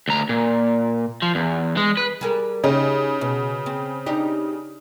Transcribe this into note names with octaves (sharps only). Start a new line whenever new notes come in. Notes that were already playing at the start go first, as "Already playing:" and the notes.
D2 A#5
A#2
F3
E2
G#3
B4
G3 G#4 A#4
C#3 D#4 G4 D#5
B2
C4
D4 D#4 G4